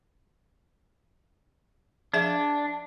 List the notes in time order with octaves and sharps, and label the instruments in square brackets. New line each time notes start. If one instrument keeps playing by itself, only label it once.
[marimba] F3 G#4 E5 [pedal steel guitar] D4